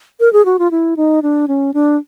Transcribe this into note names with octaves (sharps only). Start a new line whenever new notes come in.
A#4
G#4
F#4
F4
E4
D#4
D4
C#4
D4